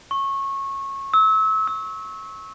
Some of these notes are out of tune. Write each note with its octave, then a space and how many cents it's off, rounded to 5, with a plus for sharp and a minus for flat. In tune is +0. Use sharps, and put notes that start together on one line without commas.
C#6 -20
E6 -30
E6 -30